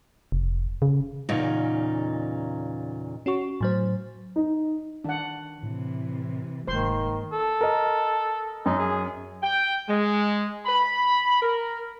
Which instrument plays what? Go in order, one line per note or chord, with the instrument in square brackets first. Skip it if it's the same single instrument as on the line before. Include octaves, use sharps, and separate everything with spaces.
[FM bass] F1
C#3
[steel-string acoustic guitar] E2 A#2 C#3 D#4
[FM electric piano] C#4 F#4 C#6
A2 F#3 C5
[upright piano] D#4
[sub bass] D#3 [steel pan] D4 F#5
[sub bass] A2 [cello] C3 E3
[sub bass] F1 [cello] G#2 A#3 [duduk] D#3 [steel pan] C5 C6
[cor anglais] A4
[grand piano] A#4 D#5
[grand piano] F#2 [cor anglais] D#4
[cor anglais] G#4
[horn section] G5
G#3
B5
A#4